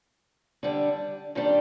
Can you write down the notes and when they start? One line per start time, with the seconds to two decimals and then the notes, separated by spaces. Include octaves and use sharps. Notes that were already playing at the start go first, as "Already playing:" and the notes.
0.63 D3 G3 D4
1.35 G2 D#3 G3 D4 G4